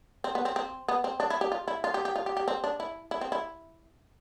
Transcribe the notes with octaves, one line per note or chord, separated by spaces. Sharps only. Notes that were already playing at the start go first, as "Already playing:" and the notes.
C4
B3
C4
C4
B3
C4
D4
E4
G4
F4
E4
F4
G4
G4
F4
G4
G4
C4
D4
E4
E4
C4
E4